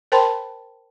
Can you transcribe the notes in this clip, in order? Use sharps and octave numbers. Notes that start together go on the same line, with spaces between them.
A#4 C5 G5 A5 B5 C6